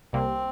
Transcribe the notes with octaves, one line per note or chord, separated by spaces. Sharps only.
C2 C3 G3 A#3 C4